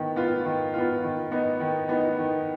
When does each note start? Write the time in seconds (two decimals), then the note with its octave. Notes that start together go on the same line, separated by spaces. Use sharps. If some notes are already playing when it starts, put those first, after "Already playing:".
Already playing: D#3 B3
0.16 B3 F4
0.45 D#3
0.74 B3 F4
1.03 D#3
1.32 B3 D#4
1.60 D#3
1.89 B3 D#4
2.19 D#3